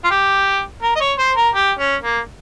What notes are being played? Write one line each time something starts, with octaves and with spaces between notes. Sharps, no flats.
F4
G4
A#4
D#5
C#5
C5
A#4
G4
C#4
A#3